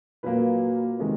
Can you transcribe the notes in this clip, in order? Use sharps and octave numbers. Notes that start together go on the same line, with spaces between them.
A#2 F#3 A#3 B4
C3 D#3 G#3